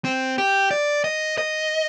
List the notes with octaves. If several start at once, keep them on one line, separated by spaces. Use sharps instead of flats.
C4
G4
D5
D#5
D#5